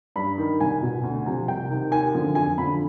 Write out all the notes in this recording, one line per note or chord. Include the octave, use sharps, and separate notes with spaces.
G2 B5
D#3
C2 G#5
B2
D2
C3 F3
C2 G5
C3 D#3
D#2 G#5
D3 F3
F2 G#5
D3 F3 B5